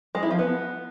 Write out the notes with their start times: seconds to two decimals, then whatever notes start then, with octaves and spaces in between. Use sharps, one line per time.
0.15 G#3
0.23 E4
0.31 F3
0.39 B3